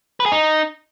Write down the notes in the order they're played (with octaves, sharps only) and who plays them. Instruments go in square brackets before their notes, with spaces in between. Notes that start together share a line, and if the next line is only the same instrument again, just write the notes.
[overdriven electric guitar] B4
G#4
D#4